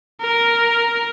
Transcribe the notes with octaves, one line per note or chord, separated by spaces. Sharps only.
A#4